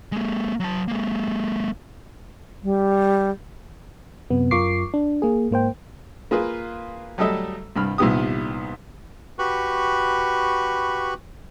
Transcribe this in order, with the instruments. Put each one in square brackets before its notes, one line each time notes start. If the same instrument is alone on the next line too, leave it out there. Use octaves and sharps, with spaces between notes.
[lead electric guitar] G#3 A#3
F#3 A5
G#3 A#3
[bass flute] G3
[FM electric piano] F#2 C3 B3
F#2 F4 A#4 C#6 D6 C7
D4
A#3 G#4
G#2 A#3 C5 G5
[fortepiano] A#3 F4 G#4 B4
F#3 G3 A3 A4 D#5 E5
C2 G2 B5 F6
C2 A#2 D#3 B3 G4 D#6
[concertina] F#4 G4 B4 B5 C#6